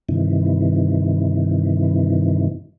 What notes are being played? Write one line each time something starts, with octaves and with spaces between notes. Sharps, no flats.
G2 C3 D#3 E3